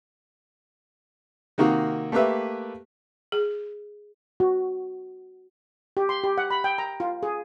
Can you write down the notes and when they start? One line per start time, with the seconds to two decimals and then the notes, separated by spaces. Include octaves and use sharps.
1.58 C3 D#3 A#3 D#4 F#4
2.12 A3 A#3 G4 B4 E5
3.32 G#4
4.40 F#4
5.97 G4
6.09 C6
6.24 G4
6.38 F#5
6.50 B5
6.64 G5
6.78 A#5
7.00 F4
7.23 G#4